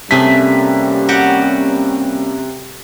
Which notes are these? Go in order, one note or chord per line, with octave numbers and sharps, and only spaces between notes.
C3 G3 A3 A#3 C#4 G#4 B6
F#4 G4 F#5